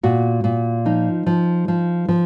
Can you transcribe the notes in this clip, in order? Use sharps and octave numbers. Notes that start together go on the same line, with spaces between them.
A#2 F#4
A#2
F3 D#4
F3
F3
F3